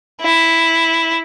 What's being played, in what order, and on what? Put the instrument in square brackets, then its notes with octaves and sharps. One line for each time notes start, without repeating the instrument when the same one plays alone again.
[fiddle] E4